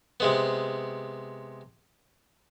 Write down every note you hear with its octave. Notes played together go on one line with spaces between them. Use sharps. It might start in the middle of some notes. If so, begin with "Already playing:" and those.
C3 G#3 B3